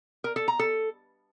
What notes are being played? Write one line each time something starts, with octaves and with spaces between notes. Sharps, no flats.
A#4
A4
A#5
A4